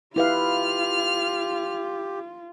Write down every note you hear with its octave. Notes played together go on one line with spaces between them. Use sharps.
E4 F4 G4 B4 F5 F6